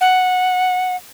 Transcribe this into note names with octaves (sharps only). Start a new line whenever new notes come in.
F#5